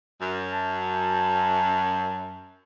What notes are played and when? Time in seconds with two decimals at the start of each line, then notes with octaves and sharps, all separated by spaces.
0.21 F#2
0.53 A5